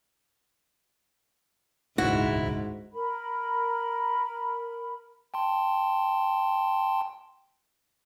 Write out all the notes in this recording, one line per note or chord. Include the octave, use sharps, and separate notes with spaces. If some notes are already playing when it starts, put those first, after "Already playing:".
D#1 C#2 G#2 D4 E4 F#4
A#4 B5
G5 A5 C6